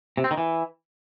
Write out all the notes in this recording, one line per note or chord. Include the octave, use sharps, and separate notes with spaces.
C3
C4
D#3
E3